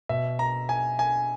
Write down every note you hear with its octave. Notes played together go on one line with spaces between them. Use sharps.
B2 E5
A#5
G#5
G#5